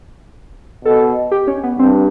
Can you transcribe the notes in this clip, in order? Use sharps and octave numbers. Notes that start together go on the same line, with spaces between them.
B2 A4
G4
C#4
B3
G2 C4